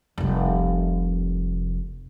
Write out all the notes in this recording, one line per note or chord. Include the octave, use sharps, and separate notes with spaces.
F1 C2